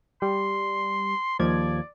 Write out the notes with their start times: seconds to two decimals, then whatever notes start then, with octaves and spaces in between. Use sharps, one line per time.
0.22 G3 C6
1.39 D#2 F3 D5 G#6